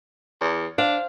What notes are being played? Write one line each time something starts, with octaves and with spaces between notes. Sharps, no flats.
E2
D4 C5 F5